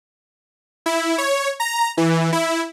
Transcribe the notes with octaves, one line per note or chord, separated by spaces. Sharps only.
E4
C#5
A#5
E3
E4